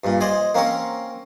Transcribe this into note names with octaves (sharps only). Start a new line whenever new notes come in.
G2 A#2
C5 D5 D#5 G#5
A#3 C4 C#4 A#4